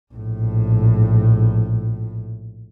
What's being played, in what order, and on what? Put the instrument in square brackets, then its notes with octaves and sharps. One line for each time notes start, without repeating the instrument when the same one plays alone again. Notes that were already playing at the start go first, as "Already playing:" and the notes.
[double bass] A#1 A2